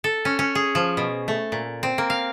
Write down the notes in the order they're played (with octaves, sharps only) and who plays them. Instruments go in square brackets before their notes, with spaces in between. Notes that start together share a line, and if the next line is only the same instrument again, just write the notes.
[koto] A4
C#4
C#4
G#4
F3
B2
A3
A#2
C4
A#3
F5